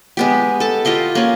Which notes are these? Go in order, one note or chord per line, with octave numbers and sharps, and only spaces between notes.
G#3 B3 G4
A4 A5
F4 G4 D#5 F5
A#3 C#4 G#4